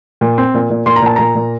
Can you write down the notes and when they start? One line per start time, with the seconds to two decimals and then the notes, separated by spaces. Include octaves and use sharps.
0.21 A#2
0.38 C4
0.54 A#2
0.70 A#2
0.86 A#2 C6
0.96 A#5
1.02 A#2 A5
1.16 A#2 A#5
1.35 A#2